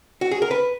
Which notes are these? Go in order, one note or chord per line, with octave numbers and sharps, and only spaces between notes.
F#4
G#4
A#4
B4